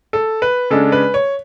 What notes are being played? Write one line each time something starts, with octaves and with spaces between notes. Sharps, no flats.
A4
B4
C#3 G#3 D4 A4
B4
C#5